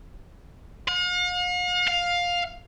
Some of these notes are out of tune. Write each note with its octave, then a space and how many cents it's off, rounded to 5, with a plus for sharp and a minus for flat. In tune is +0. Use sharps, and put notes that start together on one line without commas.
F5 +45
F5 +10